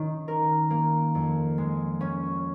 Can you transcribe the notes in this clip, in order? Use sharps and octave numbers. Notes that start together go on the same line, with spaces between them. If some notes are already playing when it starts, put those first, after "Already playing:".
Already playing: D#3 C#4
A#4
A#3
F2
G#3
C#4